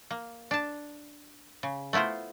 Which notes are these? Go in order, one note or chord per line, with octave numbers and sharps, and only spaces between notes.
A#3
D4 A5
C#3
A3 B3 E4 F4 C5